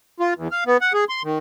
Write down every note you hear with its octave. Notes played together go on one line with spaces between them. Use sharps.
F4
E2
F5
B3
F#5
G#4
C6
D#3